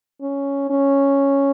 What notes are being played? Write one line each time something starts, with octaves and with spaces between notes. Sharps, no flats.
C#4
C#4